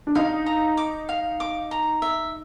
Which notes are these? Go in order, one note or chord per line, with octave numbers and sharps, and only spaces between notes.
D4
D#4 F5
A#5
D6
F5
D6
A#5
E5